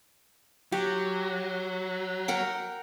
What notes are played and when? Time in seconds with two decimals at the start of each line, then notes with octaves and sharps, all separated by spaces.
0.72 F#3 G4
2.28 A#4 F#5 G5